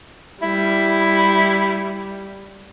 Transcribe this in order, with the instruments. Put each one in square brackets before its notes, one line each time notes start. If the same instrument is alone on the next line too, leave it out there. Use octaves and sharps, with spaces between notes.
[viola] G3 [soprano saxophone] E4